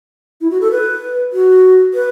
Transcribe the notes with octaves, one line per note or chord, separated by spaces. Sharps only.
E4
F#4
A4
B4
F#4
B4